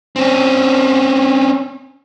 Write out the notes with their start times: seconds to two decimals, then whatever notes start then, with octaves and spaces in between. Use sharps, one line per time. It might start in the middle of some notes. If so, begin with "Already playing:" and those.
0.16 C4 C#4